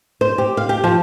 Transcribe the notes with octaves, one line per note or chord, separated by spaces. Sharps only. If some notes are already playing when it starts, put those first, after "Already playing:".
C5
G4
F5
G4
F3